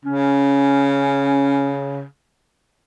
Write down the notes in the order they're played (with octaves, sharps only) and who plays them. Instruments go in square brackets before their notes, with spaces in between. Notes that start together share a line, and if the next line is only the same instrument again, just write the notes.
[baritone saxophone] C#3 [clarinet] C#4